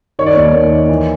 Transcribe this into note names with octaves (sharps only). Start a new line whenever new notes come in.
D#3 C#5
D5
D#2 C#5
D#2
D#3
E3